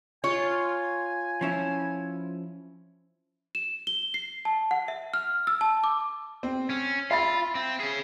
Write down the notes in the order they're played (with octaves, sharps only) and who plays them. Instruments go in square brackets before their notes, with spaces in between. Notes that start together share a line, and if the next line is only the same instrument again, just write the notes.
[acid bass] F4 [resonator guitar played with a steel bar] C#5 [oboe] G#5
[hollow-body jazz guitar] F3 C#4 E4
[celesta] E7
G7
C7
A5
F#5
E5
F6
E6
A5
D6
[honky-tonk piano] C4
[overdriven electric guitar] C#4
[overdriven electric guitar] F4 [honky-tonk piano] E5 B5 A6
[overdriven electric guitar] C4
C#4 G#4